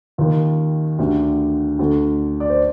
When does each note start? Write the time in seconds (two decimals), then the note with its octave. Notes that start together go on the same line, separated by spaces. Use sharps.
0.18 D#2 D#3 F4
0.99 D2 D3 G4
1.79 D2 D3 A4
2.40 D5
2.50 C5